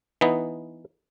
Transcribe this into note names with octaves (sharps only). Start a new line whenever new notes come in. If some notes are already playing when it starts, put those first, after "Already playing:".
E3 B3 D#4